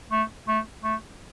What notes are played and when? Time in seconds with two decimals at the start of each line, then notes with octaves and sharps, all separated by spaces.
0.11 A3
0.48 A3
0.84 A3